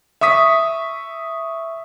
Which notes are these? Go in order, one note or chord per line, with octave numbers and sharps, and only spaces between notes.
E5 C#6 D#6 B6